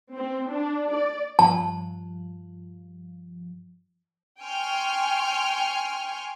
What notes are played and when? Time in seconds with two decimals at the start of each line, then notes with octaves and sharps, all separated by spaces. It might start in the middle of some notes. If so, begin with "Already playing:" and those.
0.15 C4
0.51 D4
0.93 D5
1.39 G2 F3 A5
4.41 G5 G#5 C6 C#6 F6